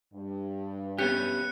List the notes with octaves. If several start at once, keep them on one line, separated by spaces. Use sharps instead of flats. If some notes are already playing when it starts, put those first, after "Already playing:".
G2
B3 C#4 G4 F#6 C#7